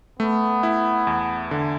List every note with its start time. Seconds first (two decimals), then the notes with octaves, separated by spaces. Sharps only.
0.20 A3 B3
0.63 E4
1.07 E2
1.51 D3